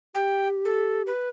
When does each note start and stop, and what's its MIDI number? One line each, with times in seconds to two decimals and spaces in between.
0.15 1.11 67
0.15 0.48 79
0.65 1.02 69
1.07 1.29 71